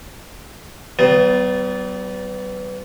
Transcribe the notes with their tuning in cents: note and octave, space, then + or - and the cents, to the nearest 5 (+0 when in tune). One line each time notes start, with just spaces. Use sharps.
G3 -40 B3 +20 F4 +0